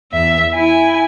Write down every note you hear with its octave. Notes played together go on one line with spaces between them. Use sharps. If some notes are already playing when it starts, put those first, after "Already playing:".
E2 E5
E4 G#5